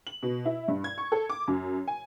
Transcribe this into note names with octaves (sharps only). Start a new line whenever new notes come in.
F#7
B2
E4
G2
G#6
C#6
A4
D6
F#2
G#5